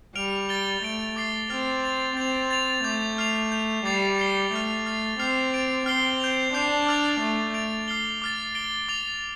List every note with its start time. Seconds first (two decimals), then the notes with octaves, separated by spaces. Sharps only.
0.16 G3 F6 D7 F7
0.49 A6 D7 G7
0.83 A3 A6 D7 F7
1.16 D6 A6 C7 G7
1.49 C4 F6 A6 F7
1.84 A6 F7
2.17 C4 A6 F7
2.51 A6 F7
2.84 A3 D6 G6 F7
3.18 F6 C7 F7
3.52 G6 F7
3.85 G3 D6 A6 C7 F7
4.18 A6 C7 G7
4.52 A3 F6 A6 F7
4.86 F6 A6 C7 F7
5.19 C4 D6 F6 C7 F7
5.53 A6 D7 F7
5.86 C4 F6 C7 G7
6.20 G6 F7
6.53 D4 D6 G6 C7 F7
6.87 D6 F6 A6 F7
7.21 A3 A6 F7
7.54 A6 D7 F7
7.88 D6 F6 C7 G7
8.22 D6 F6 A6
8.55 A6 D7 G7
8.88 D6 A6 F7